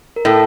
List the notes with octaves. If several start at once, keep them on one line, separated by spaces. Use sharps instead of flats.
A#4
A2 A4